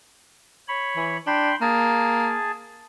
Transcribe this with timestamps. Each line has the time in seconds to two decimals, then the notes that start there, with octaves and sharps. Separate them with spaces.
0.68 C#5 B5
0.96 E3
1.27 D4 G5 B5 C6
1.61 A#3 G#4 A5